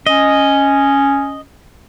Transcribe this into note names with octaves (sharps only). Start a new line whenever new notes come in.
C#4 D#5